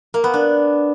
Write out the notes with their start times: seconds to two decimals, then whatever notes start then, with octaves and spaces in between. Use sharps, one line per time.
0.14 A#3
0.24 B3
0.34 D4